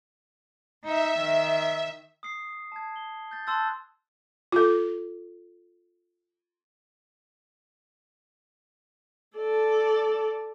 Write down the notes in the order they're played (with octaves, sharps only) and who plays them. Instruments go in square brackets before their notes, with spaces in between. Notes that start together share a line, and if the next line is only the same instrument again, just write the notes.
[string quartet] D#4 [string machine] E5
[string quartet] D#3
[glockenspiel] D#6 C7
A5 G#6
G7
G6 A6
A5 C6 E6 F#6 G6 A6
[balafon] F4 A4
[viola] A4 D5